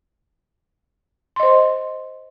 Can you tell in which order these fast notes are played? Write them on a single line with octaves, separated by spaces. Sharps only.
C6 D#5 C5